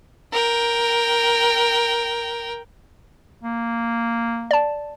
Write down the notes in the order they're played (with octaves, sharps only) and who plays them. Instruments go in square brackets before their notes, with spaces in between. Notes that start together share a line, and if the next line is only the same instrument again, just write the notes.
[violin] A#4 G5
[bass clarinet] A#3
[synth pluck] D5 A5